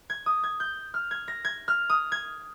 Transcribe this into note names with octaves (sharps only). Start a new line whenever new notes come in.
G#6
D#6
G#6
G6
F6
G#6
A#6
G#6
F6
D#6
G#6